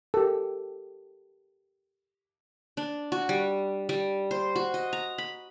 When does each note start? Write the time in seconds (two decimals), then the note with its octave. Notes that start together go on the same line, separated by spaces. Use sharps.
0.14 G4 A4 A#4
2.77 D4
3.12 F#4
3.29 G3
3.89 G3
4.31 C5
4.55 F#4
4.74 D#5
4.93 A#5
5.18 B5